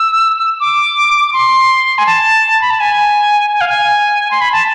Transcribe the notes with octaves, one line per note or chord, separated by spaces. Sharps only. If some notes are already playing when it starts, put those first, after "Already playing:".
Already playing: E6
D6
D6
C6
G#5
A5
B5
A5
G#5
G#5
F5
G#5
C6
B5
A5